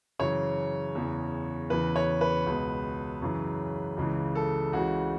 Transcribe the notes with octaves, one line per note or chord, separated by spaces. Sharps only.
F#2 C#3 E3 C#5
E2 C#3 E3
E2 C#3 E3 B4
C#5
B4
C#2 B2
F#2 C#3 E3
C#2 C#3 E3
A4
C#2 C#3 E3 F#4